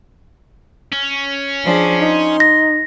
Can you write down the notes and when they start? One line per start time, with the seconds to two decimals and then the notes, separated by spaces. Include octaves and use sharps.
0.93 C#4
1.66 F3 D4 G#4
2.01 D#4 C6
2.40 A#6